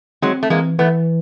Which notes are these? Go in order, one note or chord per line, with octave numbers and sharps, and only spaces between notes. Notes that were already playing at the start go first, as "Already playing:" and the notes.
F#3 G#3 C4
A3
E3 G#3 A#3
E3 A3 B3